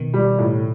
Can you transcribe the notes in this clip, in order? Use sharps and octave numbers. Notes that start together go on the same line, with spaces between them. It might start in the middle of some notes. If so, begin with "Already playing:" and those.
Already playing: B2 D#3
G3
A2